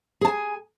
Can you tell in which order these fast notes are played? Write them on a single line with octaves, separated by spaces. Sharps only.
G#4 A5 G#5